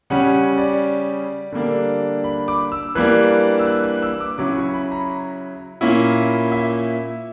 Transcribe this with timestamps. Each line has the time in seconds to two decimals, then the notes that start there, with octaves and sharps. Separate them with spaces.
0.10 C#3 G3 C#4 F#5
0.34 F#5
0.58 D5
1.52 D3 G3 A#3 D4
2.24 B5
2.48 D6
2.72 E6
2.95 E3 G3 A#3 D4 F#6
3.59 E6
3.67 F#6
3.84 F#6
4.02 E6
4.20 D6
4.38 C#3 F#3 C#4 E4 D6
4.56 C#6
4.74 B5
4.92 A#5
5.81 A#2 A#3 C#4 E4
6.52 E5